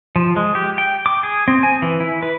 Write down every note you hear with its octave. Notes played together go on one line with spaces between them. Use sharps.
F3
G#3
G4
G5
D6
G#4
C4
G#5
E3
E4
B4